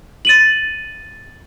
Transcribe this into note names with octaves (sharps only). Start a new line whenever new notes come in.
A6 D#7 F#7